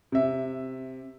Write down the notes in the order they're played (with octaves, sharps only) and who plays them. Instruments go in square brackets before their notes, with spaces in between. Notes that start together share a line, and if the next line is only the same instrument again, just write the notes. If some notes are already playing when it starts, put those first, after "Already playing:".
[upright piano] C3 E5